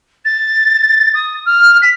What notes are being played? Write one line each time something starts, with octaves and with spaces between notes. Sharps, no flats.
A6
D#6
F6
B6